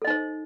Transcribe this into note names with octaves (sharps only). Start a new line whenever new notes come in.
D#4 A4 C5 D#5